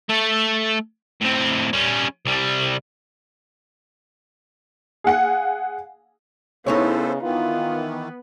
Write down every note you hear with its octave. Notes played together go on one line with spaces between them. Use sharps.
A3 A4
A2 C4
G3 C#4
C2 G3
G#4 F5 F#5 G#5
C#3 B3 D#4 E4 A4 C5 C#5
D#3 E3 B3 F4